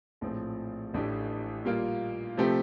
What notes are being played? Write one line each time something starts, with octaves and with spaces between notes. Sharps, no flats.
A#1 A2 F3 C4
A1 A2 A3 D4 G4
A#2 G3 A#3 F4
C3 F3 A3 C4 G4